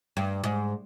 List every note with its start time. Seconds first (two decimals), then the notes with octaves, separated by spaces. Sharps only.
0.17 G2
0.44 G#2